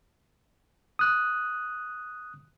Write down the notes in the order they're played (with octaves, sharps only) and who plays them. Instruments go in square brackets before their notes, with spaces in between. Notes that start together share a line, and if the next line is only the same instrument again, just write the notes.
[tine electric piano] D#6 F#6